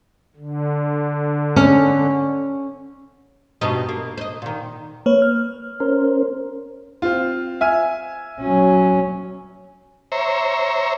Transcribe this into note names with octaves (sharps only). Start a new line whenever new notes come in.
D3
C#4
G2 B2 D#4
A#3
C5 D#5
A#2 D#3
A#3 B4 C#5
F6
C#4 A#4 C5
C4 F4
E5 G#5 F6
F#3 C#4
C5 C#5 E5 A#5